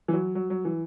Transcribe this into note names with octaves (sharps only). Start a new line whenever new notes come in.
E3
F#3
F#3
F#3
E3